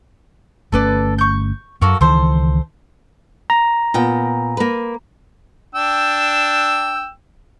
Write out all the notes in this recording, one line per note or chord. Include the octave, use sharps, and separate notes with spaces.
G1 A3 C#4 A4 B4 D5
C#6 G6
F#2 A#3 F#4 A4
C#2 D#3 E3 A4 C5
A#5
A#2 B3 G5
A#3 B4
D4 G5 E6